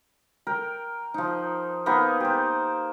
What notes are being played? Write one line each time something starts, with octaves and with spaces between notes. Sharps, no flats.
A#4 G5
F3 D#4
A#3 B3 D#4 G#4
G4 C5